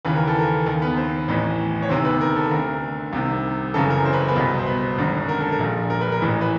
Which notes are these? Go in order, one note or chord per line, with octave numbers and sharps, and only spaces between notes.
D#2 C#3 E3 B4
A#4
A4
A#4
D#2 D#3 A#4
B3 B4
C4 C5
A1 A2 E3
C#5
D2 C3 D#3 C4 C5
B3 B4
A#4
A4
D2 D3 A#4
C2 C3 D#3
F#1 F#2 C#3 E3 A4
A#4
C5
B4
A#4
B3 B4
C2 B2
C5
B3 B4
G#1 F#2 D3
A#4
A4
A#4
A#1 A#2
A#4
B4
A#4
A1 A2 E3
B4